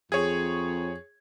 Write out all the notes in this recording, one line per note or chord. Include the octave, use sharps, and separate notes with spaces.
F2 G#4 C#5